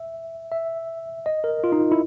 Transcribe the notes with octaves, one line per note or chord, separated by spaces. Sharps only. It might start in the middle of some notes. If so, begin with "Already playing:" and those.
Already playing: E5
E5
D#5
A#4
F4
D#4
E4